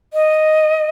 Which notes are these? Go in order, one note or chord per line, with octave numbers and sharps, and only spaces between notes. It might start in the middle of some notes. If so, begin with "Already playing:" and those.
D#5